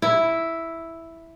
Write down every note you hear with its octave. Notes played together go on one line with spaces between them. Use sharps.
E4